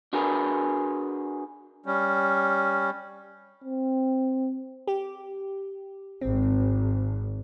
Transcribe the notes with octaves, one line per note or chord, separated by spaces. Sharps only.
D4 F#4 G#4 A#4 B4
G3 C#4
C4
G4
G#1 C4